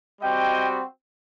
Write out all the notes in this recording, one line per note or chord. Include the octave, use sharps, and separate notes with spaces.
G3 C4 F#4 D#5 G5